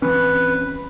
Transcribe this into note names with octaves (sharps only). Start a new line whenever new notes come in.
E3 C4 C#4 B4